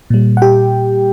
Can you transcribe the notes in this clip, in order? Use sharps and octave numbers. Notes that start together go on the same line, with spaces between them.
A#2 G3
F#5
G4 G5